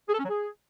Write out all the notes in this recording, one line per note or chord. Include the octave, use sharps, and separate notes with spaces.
G#4
A4
C#4
F#3
G#4